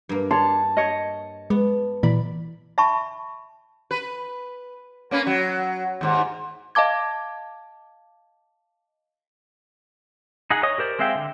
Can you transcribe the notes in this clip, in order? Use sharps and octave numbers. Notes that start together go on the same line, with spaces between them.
G2 A#3
D4 C#5 A5 C6
C#5 D#5
G#3 B3
A#2 E3 D5 B5
E5 A5 B5 C#6
B4
A#3 C#4 B4
F#3
D#2 G#2
D#5 F5 A5 D6 G#6
D#4 G#4 F#5
C#5 D#5 D#6
G4 A#4 C5 D5
G#3 C4 E5 F5 G5
D3